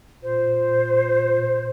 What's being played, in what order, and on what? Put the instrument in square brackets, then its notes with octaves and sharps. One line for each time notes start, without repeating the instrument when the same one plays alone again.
[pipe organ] A#2 [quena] C5